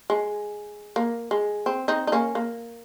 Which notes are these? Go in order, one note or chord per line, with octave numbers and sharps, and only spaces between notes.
G#3
A#3
G#3
C4
C4 D#4
D#4
A#3 C#4
A#3